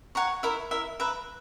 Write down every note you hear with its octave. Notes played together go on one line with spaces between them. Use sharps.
C#5 F#5 A#5 C#6
E4 A#4 E5
E4 A#4 E5
B4 E5 A#5